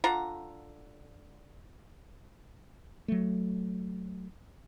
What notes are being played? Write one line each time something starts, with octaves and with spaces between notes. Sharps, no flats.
D3 F4 F#5 A#5
F#3 A3